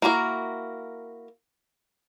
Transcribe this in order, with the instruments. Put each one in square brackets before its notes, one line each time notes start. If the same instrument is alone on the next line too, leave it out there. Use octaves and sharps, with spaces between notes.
[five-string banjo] A#3 E4 F#4 G#4 A#4